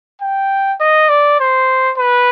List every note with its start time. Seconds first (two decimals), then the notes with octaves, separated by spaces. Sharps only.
0.22 G5
0.80 D#5
1.09 D5
1.40 C5
1.98 B4